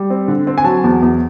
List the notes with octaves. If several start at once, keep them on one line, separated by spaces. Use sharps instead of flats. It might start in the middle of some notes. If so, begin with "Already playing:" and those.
Already playing: G3
C4
D3
C4
G#5
F#3 A5
E2
E2